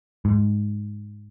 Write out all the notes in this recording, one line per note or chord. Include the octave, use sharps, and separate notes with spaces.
G#2